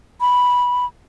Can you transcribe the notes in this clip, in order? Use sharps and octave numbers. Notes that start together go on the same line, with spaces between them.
B5